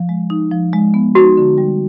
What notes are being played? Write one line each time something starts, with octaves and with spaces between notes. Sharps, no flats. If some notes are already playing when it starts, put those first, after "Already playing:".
Already playing: F3
G#3
D#4
F3
G#3
B3
D#4 F#4
D3
G3